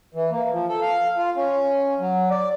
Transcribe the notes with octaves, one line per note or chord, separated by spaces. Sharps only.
E3
A#3
F3
A4
F5
F4
C#4
F#3
D5